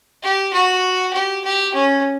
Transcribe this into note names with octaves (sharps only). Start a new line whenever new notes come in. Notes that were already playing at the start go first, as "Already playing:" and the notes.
G4
F#4
G4
G4
C#4